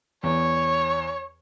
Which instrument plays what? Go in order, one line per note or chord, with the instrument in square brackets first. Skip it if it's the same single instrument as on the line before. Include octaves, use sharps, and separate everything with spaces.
[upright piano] E2 [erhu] C#5